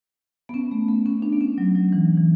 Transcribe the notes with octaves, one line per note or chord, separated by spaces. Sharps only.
B3
C#4
A3
B3
C#4
D4
B3
C#4
F#3
F#3
E3
E3